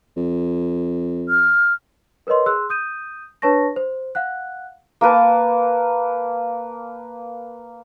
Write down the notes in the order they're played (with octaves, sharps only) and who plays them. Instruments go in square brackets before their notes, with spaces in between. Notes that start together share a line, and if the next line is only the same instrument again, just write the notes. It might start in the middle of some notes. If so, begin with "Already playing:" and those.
[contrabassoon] F2
[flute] F6
[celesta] A#4 B4 C#5 D#5 C6
G#4 C6 E6 F#6
D#6 G6 D#7
D4 B4 C#5 A5 C#6 A#6
C5
F5 F#5 F#6
[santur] A#3 A#4 B4 A5